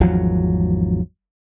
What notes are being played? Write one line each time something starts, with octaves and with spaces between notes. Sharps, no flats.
G#1 E2 F3 F#3